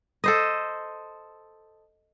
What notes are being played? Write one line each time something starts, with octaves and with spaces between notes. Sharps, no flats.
A4 C5 D#5